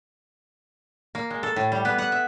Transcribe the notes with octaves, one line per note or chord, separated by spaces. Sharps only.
A#3
G#3
A4
A2
G3
B3
F#5
E5